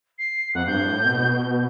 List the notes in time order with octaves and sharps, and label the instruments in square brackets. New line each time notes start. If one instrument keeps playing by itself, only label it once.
[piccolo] C7
[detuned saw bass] F2 [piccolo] F#5
[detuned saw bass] G2 [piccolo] G6
[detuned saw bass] A2
B2